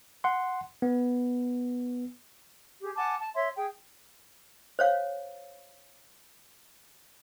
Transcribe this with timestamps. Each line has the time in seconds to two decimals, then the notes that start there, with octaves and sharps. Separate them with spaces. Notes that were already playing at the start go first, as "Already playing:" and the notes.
0.24 F#5 C6
0.82 B3
2.81 G4 G#4
2.96 F#5 G#5 A5 D6
3.20 A5
3.34 C#5 E5 C6
3.57 G#4 G5
4.79 C5 C#5 F5